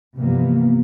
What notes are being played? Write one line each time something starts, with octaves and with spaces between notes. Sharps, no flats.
G2 C3 E3 F3 A#3 B3